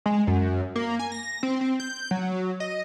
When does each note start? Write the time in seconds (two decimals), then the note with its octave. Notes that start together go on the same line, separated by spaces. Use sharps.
0.06 G#3
0.27 F#2
0.76 A#3
0.99 G#5
1.12 A#6
1.43 C4
1.61 C4
1.80 G6
2.11 F#3
2.60 D#5